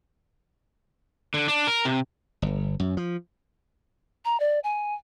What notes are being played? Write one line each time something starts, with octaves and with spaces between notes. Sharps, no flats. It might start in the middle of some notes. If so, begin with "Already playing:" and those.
D3
D4
A#4
C3
G1
F#2
F3
A#5
D5
G#5